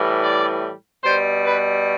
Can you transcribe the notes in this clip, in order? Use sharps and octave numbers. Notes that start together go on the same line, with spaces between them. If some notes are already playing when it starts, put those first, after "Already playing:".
Already playing: A2 E3 G3
D5
B2 G3 C5
B4